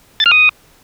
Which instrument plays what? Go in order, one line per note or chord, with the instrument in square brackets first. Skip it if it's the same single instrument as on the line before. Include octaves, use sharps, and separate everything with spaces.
[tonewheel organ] A6
F6
D#6